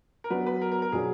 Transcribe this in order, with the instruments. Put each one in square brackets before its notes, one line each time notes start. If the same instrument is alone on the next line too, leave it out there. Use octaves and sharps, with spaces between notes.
[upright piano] A#4
[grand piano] F#3 B3 D4 [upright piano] B4
[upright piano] B4
A#4
A#4
A#4
[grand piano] B2 F#3 D4 [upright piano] G#4